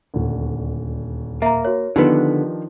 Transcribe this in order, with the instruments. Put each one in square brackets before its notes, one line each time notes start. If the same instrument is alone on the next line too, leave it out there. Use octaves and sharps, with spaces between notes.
[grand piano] D#1 D2
[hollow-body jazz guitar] A#3 [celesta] E5 A#5
[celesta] F#4 C#5 [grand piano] A#4
[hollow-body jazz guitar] D3 B3 [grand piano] D#3 F3 D4 [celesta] D#4 G4 B4